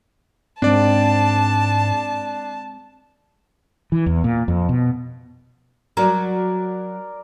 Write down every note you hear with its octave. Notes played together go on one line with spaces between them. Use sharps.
G#2 G#3 C4 D4 D5 A5
E3
E2
A#2
F2
B2
F#3 A#4 D5